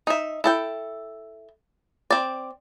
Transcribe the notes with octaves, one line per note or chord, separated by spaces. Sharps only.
D#4 E5
E4 A4 G5
C4 D5